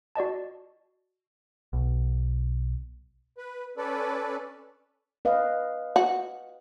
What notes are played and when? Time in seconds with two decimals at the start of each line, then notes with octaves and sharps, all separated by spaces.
0.16 F#4 D5 D#5 A5
1.73 B1
3.38 B4
3.77 C#4 A4 B4 D5
5.25 B4 D#5 F5
5.96 F#4